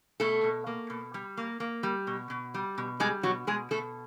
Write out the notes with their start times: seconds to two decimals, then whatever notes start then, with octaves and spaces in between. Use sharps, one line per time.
0.20 B2 A3 A4
0.43 B2
0.67 A#3
0.90 B2
1.14 G3
1.37 A#3
1.60 A#3
1.83 G3
2.07 B2
2.30 B2
2.54 G3
2.78 B2
3.00 G3 G#3 G#4
3.23 B2 F#3 F#4
3.47 B2 G#3 G#4
3.71 B2 A3 A4